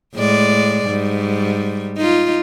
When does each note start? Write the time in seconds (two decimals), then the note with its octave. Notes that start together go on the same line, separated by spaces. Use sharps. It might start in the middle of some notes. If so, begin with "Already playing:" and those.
0.15 A2 G#3 D5
0.86 G#2 G3
1.97 D#4 F4